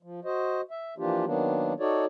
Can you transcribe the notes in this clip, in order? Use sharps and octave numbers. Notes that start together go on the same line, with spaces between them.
F3
F#4 C5 D#5
E5
E3 F3 A#3 D4 F4 G4
D#3 F#3 A#3 B3 D4
D#4 F#4 A4 C#5 D5